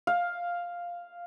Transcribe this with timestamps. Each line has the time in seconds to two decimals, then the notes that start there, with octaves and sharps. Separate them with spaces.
0.07 F5